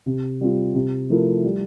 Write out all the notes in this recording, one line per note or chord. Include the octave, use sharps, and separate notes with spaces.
C3
G3 C4 F4
C3
F3 A3 E4 A#4
G3